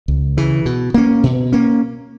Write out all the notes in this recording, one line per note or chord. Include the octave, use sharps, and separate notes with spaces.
C#2
C#3 E3
B2
A#3 C#4
B2
A#3 C#4